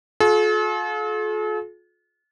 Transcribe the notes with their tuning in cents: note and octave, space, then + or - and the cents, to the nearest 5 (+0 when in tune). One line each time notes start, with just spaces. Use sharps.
F4 +35 A4 -45